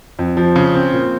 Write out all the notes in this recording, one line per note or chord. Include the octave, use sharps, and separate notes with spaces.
F2
F3
C#3
C4
A#2